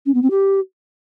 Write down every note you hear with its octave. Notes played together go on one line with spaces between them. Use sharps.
C#4
B3
C4
G4